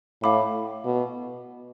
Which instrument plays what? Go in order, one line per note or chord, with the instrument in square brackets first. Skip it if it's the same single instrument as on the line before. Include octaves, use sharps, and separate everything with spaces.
[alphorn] A2 [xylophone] F5 B5 D6
[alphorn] B2